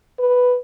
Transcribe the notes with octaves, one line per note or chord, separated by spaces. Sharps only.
B4